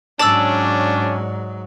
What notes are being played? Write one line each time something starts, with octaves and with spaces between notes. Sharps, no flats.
G#2 F#3 C#4 D4 D5 A5 E6